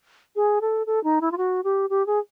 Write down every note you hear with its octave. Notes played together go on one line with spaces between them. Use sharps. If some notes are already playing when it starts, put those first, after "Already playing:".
G#4
A4
A4
D#4
E4
F4
F#4
G4
G4
G#4